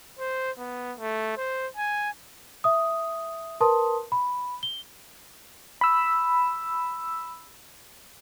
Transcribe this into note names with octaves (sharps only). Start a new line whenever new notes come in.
C5
B3
A3
C5
G#5
E5 D#6
A#4 B4 A5 C6 D#6
B5
G7
B5 E6